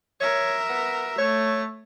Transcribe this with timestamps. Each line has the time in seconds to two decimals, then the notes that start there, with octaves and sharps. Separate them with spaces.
0.21 A#4 C#5 E5
0.69 B3
1.18 A3 C#5